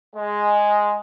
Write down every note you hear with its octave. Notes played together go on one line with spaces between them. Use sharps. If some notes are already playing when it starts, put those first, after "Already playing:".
G#3